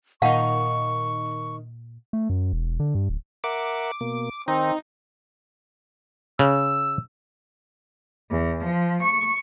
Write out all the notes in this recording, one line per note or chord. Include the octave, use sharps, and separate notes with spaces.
A#2 D#3 D#4 F5 F#5 A5 C#6
A3
F#2
E1
D3
G2
D1
A#4 E5 F#5 D6
B2 A#3
D#3 C4 D#4
C#3 E6
E2
F3
C#6